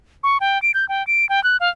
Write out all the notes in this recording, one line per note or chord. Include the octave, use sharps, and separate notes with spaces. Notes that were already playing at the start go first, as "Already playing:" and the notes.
C#6
G5
D7
G6
G5
D7
G5
F#6
F5